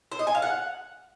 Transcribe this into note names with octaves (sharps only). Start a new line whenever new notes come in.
C5
D#5
G#5
F5
F#5